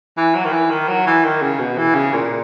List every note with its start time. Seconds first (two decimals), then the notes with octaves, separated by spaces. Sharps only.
0.17 E3
0.35 F#3
0.45 D#3
0.53 E3
0.71 D#3
0.88 F#3
1.07 E3
1.25 D#3
1.42 C#3
1.59 B2
1.78 E3
1.95 C#3
2.14 A#2